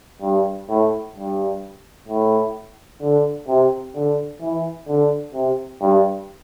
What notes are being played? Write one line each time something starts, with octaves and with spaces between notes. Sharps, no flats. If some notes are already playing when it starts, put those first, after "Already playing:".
G2
A2
G2
A2
D3
C3
D3
E3
D3
C3
G2